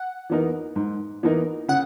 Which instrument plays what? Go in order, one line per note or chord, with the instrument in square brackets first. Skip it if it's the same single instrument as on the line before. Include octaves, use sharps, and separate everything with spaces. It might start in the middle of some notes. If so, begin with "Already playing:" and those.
Already playing: [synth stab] F#5
[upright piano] E3 B3 D#4 A#4
G#2
E3 B3 D#4 A#4
[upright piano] C#3 [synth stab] F#5